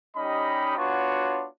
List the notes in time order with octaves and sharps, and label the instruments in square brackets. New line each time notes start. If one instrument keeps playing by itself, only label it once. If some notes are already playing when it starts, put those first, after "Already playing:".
[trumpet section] G3 C#4 D#4 G4 D#5 B5
B3 D4 F4 F#4 C#5